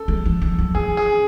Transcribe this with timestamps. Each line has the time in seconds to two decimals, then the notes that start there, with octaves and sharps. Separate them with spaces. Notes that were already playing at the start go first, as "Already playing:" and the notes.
Already playing: A4
0.08 G#3
0.25 E3
0.41 E3
0.58 F#3
0.75 E3 G#4
0.97 G#4